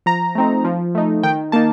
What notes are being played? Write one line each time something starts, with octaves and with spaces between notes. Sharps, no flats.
F3 A#5
A3 C4 D#4
F3
A3 D#4
D#3 G5
A#3 D#4 A5